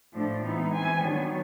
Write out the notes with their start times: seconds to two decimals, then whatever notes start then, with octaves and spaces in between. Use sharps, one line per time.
0.14 A2 F3 A3 D4
0.43 E3 G#3 B3 D#4
0.73 E3 G#3 C4 G#5
1.03 D#3 F#3 B3 D4